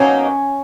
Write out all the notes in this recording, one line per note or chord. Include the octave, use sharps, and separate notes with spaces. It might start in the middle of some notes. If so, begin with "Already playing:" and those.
Already playing: B2 F#3 A#3 C#4 D#4